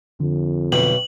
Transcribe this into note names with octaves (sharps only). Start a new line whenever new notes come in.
F2 D3
B1 B2 G4 F#7